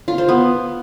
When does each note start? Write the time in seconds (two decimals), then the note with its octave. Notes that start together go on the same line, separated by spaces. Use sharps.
0.08 F4
0.18 C5
0.29 B3